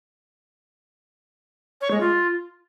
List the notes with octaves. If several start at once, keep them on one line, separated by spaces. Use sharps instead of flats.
C#5
G#3
F4